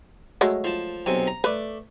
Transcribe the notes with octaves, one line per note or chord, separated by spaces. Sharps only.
F#3 G#3 A3
F3 A5
B1 C3 G#5
A#5
A3 B4 D5